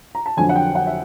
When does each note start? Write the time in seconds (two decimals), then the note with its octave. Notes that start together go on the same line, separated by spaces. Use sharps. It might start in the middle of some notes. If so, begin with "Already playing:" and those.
0.15 A#5
0.26 A5
0.37 F2 D3 F#3 G#5
0.49 F#5
0.56 G5
0.75 F#5
0.86 E5